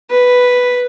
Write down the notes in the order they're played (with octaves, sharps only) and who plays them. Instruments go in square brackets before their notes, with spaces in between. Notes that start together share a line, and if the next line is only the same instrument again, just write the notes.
[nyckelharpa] B4